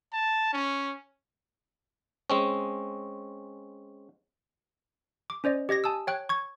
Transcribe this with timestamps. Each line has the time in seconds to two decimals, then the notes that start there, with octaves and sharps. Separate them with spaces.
0.13 A5
0.53 C#4
2.30 G#3 C4 C#4
5.30 D6
5.44 C#4 C5 D5 D#5
5.69 G4 D#5 G#6 A#6
5.84 G#5 A5 D#6 E6
6.07 C#5 G5 F#6 G#6
6.29 C#6 G#6